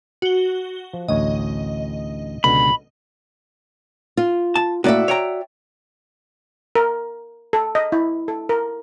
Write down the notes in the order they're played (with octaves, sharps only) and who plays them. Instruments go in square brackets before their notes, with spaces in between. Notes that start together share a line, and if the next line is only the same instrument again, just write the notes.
[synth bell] F#4 G7
[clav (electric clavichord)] F3
[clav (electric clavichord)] A1 D2 C#5 [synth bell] D#5
[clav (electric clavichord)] C#2 B2 D3 [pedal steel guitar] B5
[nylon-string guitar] F4
[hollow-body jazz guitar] A5
[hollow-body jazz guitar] A2 A#3 [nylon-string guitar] F#4 D5 E5
[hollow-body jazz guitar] C#5 G5 A#5
[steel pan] A#4
A4
D#5
E4
A4
A#4